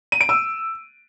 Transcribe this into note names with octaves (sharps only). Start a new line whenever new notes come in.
D#7
D7
E6